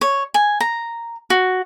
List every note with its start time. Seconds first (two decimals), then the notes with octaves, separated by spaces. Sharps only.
0.01 C#5
0.34 G#5
0.61 A#5
1.30 F#4